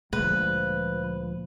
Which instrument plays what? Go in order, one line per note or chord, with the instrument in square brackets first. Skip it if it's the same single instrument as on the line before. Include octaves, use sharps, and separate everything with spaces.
[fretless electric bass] D2 A#2 G#3 [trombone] F3 [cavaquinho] B4